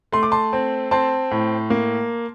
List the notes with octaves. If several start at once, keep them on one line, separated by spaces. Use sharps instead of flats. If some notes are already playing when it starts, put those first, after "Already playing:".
A3 C6
D6
A5 C6
C4
C4 A5 C6
A2
A#3